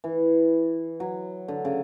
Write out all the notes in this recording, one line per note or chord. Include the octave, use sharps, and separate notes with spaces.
E3
F#3
D3
C#3